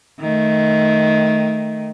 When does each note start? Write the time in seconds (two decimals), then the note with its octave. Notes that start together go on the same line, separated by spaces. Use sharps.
0.21 D#3 A3